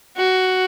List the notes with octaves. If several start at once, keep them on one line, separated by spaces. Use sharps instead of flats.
F#4